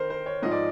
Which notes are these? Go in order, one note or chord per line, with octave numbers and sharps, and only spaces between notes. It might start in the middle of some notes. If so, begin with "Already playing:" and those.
Already playing: D#3 A#4 C5
C5
C#5
G#2 F3 D#5
D5